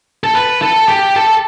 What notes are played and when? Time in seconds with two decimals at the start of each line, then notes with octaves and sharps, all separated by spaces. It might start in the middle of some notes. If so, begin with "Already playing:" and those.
0.24 A4
0.35 B4
0.62 A4
0.88 G4
1.16 A4